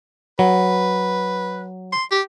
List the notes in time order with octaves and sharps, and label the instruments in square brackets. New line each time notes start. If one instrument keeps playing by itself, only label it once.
[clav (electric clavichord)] F#3 [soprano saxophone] B4
[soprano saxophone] C6
G4